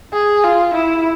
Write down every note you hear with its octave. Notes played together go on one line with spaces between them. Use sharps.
G#4
F4
E4